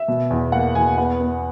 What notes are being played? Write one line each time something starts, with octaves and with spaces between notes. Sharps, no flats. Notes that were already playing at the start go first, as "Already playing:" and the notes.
Already playing: E5
B2
E2
A#3 F#5
E2 G#5
B3 F#5
B3